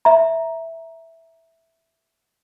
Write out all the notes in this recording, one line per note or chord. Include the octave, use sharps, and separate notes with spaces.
E5 A#5